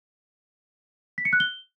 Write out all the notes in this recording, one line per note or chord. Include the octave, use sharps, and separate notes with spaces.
B6
C#7
F#6
G7